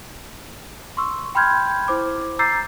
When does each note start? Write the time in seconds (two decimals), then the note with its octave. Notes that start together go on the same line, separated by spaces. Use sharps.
0.97 C6 C#6 E6
1.35 G5 B5 C6 F6 G6 G#6
1.88 E4 C5 D6
2.39 A#5 D6 E6 G6 A6 C7